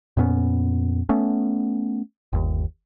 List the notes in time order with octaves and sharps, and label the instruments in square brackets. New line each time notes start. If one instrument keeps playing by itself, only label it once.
[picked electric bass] F2 A#2 B3 C#4
A3 B3 C#4
G1 D#2